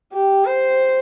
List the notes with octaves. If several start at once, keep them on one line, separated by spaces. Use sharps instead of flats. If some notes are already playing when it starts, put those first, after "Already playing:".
G4
C5